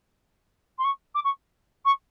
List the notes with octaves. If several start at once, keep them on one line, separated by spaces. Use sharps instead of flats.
C6
C#6
D6
C#6
C#6